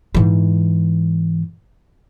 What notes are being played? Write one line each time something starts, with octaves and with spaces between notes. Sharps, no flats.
G#2 E3